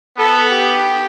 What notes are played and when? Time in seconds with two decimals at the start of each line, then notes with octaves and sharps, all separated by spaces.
0.18 B3 A4
0.52 G4